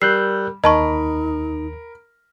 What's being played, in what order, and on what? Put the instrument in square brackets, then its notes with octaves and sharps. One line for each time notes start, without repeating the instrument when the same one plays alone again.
[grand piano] G3 [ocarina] A#4 [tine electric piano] E6 F#6 G6 [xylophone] C7
[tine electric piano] D#2 [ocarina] D#4 [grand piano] A#4 B5 [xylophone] D#5 A5 C#6